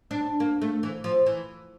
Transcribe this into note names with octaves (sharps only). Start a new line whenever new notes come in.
D4
A#3
A3
E3
F3
E3